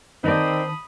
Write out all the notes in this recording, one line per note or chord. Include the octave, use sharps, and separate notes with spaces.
D#3 C4 D#4 A#4 D5 A5 B5 D#6